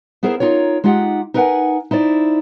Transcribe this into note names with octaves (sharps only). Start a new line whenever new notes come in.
B3 E4 G#4 A#4 C5
D#4 F4 A#4 C#5
G#3 D#4 F4 G4 F#5
D#4 A#4 B4 D5 F#5 G#5
D#4 E4 C5 D5